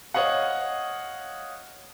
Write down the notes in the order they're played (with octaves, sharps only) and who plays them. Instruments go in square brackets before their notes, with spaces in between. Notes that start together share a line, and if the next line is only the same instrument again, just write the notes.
[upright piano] C#5 D#5 F5 F#5